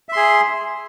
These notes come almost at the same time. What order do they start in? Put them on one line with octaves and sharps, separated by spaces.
E5 C6 G#4